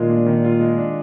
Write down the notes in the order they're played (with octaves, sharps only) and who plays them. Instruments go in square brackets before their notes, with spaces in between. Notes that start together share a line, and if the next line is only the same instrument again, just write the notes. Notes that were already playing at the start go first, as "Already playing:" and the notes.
Already playing: [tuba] A#2 [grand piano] D#3 G#3 F4
[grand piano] D4
D#3
F4
G#3
D4